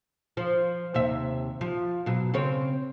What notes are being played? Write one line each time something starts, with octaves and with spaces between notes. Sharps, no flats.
F3
D#2 C3 E5
F3
B2 F#3
C#3 C4 C#5